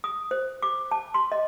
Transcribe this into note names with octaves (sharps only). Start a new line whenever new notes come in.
D#6
C5
D6
A5
C6
D#5